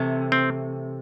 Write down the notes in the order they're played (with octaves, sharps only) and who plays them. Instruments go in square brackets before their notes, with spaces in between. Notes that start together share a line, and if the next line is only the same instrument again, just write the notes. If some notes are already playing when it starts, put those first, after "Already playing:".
Already playing: [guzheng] C3 E3 A3
[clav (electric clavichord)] C4